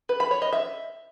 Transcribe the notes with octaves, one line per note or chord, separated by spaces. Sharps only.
B4
B5
C#5
D#5
E5